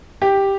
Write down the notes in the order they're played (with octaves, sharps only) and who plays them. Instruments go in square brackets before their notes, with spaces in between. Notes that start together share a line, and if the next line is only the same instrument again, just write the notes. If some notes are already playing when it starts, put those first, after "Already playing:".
[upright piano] G4